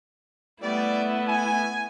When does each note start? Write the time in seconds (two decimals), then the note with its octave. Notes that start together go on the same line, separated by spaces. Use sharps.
0.62 G3 A3 B3 E4 D5
1.28 G#5